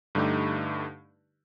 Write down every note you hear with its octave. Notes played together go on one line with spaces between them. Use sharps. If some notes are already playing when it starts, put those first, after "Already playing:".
G2 D3 A3 D#4 G4